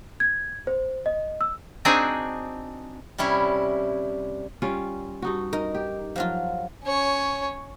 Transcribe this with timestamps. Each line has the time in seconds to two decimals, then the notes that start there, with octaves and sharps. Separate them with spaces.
0.20 G#6
0.67 C5
1.06 D#5
1.41 E6
1.85 C4 D4 D#4 F#4 G#4
3.18 C3 G3 C#4 E4
4.62 G3 C#4 F4
5.22 G2 D#4 F#4
5.53 D#4 A#4
5.75 G4
6.16 F3 F#3 F4
6.85 C#4 C#5